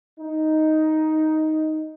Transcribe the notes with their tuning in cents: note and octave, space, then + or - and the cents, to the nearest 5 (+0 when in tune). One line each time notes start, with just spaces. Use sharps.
D#4 +5